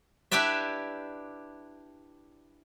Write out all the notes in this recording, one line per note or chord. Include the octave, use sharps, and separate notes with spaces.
D4 E4 G4 B4 D5 E5